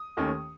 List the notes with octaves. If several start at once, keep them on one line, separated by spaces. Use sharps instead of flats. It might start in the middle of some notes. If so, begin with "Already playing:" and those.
Already playing: D#6
D#2 D#3 A3 C#4